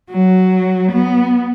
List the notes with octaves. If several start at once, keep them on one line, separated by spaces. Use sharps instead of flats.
F#3
B3